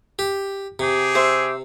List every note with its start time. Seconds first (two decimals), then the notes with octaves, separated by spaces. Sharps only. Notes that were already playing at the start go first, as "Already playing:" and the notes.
0.19 G4
0.79 C3 G4 G#4
1.15 C5 E5